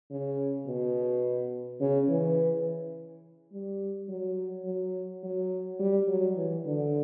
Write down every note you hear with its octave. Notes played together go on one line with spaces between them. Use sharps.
C#3
B2
C#3
E3
G3
F#3
F#3
F#3
G3
F#3
E3
D3